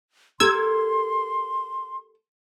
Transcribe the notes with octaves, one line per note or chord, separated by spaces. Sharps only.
G4 A4 A#4 C6 E6 G#6